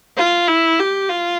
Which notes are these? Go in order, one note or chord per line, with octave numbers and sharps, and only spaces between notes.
F4
E4
G4
F4